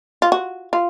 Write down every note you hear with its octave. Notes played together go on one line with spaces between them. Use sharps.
F4
F#4
F4